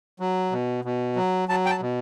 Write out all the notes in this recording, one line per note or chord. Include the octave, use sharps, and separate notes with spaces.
F#3
B2
B2
F#3
F#3 A5
G5
A5
B2